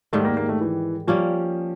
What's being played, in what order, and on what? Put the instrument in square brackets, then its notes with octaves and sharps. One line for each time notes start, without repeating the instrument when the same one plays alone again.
[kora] G#2 D#3 G3 [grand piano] A3
[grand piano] A#3
A#3
A3
E3
[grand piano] F3 [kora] G3 A#3 C#4